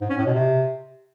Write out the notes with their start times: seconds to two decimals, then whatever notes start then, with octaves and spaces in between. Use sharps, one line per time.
0.01 G#2
0.10 C#4
0.18 A2
0.26 B2
0.34 C3